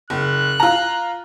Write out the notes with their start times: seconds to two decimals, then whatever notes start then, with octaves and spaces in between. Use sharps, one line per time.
0.10 F#1 F#6
0.60 F4 A#5